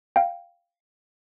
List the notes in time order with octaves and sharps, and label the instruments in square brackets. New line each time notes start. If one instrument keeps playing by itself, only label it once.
[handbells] F5 G5